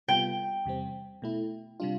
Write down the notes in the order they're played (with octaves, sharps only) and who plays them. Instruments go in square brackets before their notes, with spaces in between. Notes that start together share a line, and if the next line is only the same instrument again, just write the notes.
[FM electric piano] C3 G3 B3 F4 [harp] G5
[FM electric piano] E2 C3 G3 C4
B2 A3 E4
C3 G3 D4 F4